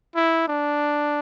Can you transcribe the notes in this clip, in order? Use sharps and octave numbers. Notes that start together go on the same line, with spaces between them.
E4
D4